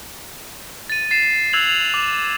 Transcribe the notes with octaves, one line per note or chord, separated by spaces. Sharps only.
A6 D#7
A6 C7 E7
E6 F#6 G#6 F7 F#7
F7
D6